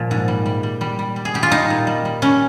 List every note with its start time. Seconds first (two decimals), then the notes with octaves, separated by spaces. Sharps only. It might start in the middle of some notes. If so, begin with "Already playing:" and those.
Already playing: A#2 F3
0.11 G#2
0.28 G3
0.46 G3
0.63 G3
0.81 G3
0.99 G3
1.16 G3
1.25 G#4
1.34 G3 G4
1.43 F4
1.51 G3 D#4
1.70 A#2
1.87 G3
2.05 G3
2.22 G3 C#4